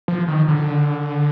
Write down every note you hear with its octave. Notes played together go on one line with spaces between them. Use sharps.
F3
D#3
D3